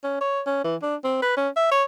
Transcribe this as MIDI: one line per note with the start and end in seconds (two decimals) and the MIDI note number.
0.04 0.19 61
0.21 0.41 73
0.46 0.63 61
0.64 0.76 52
0.82 0.96 62
1.04 1.17 60
1.22 1.34 71
1.37 1.49 61
1.56 1.68 76
1.72 1.84 73